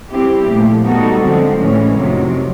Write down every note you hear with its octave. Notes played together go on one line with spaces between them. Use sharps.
G3 C4 E4 G4
A#2 F3 A3
G3 B3 D#4 F#4 A4
D3 F3 G#3 C4
A2 E3 G#3 C#4
F2 C3 D#3 F#3